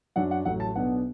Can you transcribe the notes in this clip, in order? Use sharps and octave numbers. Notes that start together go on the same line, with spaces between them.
F#2 F#3 D4 F#5
F#5
A1 A2 F#3 F#5
A5
B1 B2 B3 D4 F#5